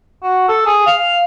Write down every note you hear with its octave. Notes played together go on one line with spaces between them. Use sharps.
F#4
A4
G#4
F5